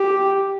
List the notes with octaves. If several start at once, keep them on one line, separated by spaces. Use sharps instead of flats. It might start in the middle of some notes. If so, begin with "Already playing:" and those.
Already playing: G4